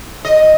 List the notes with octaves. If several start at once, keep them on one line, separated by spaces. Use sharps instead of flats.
D#5